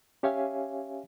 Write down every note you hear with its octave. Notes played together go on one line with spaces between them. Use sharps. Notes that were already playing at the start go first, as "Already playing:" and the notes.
C#4 G4 C#5 E5 F5 G#5